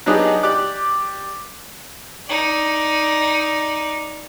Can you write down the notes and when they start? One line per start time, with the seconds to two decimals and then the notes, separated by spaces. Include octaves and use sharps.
0.06 F#3 B3 D4 D#4 G4 G#4
0.43 G4 D5 D6 F#6
2.27 D#4 D5